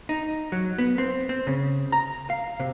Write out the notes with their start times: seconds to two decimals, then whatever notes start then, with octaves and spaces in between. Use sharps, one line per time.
0.09 D#4
0.52 F#3
0.78 B3
0.98 C4
1.29 C4
1.47 C#3
1.92 A#5
2.30 F5
2.60 C3